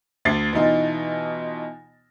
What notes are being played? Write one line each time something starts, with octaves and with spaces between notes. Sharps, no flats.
D2 A6 C7
B2 E3 D#4 F4